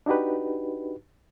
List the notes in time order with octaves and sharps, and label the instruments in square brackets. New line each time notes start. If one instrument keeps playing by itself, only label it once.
[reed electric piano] D4 D#4 F#4 G4 B4